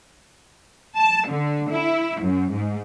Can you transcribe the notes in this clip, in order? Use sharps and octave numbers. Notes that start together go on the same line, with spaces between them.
A5
D3
E4
F#2
G#2